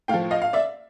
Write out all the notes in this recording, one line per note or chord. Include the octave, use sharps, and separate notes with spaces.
A2 F5 G5
F3
D#5 F5
F5
D5 E5